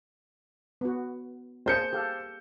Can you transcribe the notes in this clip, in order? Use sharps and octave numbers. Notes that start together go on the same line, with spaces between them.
B3 F#4
A#3 G#4 C5 A5 G6 C#7
G4 A4 F5